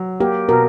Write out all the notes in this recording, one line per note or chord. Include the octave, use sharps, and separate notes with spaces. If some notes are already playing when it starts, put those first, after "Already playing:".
Already playing: F#3
A#3 G4
B2 A#4